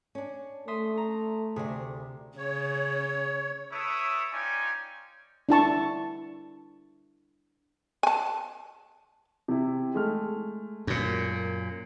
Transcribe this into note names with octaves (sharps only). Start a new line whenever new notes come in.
C#4 D4
A3 E5 C6 D#6
A#5
D2 C3 G#4
C#3 C#5
E4 A4 B4 C#5 E5 D#6
C#4 D#4 F4 D5 G5 G#5
D4 E4 A5 C#6
G#5 A5
C3 E4
G#3 A3 F6
F#2 A#2